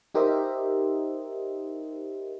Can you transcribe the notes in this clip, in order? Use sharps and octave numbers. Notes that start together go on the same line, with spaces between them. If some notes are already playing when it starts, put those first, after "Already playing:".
D#4 G4 A#4 C5 D#5 E5